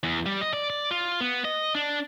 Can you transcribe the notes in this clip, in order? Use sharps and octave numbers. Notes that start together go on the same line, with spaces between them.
E2
G3
D#5
D5
D5
F4
B3
D#5
D4